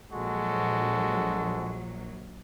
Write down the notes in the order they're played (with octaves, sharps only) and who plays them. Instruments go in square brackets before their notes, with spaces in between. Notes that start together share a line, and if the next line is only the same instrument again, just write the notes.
[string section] A#1 F#3 [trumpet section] G#3 F#4 A4